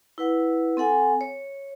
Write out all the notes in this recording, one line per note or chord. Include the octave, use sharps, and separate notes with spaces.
E4 B4 F#5
C4 A4 F#5 G#5
C#5